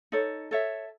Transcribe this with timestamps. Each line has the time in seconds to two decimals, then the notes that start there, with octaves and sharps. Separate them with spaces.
0.12 D#4 A4 C#5
0.51 A4 C#5 E5